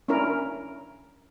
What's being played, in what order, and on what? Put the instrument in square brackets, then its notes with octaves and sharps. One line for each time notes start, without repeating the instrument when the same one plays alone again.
[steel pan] C#4 D4 E4 A#4